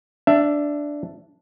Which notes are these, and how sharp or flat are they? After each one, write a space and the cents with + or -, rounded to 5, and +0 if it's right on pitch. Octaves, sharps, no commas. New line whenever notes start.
D4 +0 E5 +15